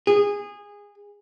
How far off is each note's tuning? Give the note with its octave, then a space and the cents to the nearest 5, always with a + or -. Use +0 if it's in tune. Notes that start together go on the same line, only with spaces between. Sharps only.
G#4 -20